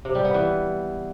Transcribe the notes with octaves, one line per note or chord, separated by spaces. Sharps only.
C3
G3
B3
E3